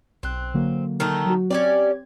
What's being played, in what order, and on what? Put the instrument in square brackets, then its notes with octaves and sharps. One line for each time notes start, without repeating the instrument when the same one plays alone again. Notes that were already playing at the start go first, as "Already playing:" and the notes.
[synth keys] B1 F#6 [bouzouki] C4
[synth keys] D3 F#3 A#3
[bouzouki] D#3 A3 D#4
[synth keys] F#3 F#4
[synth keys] C4 G#6 [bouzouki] C#4 G4 D5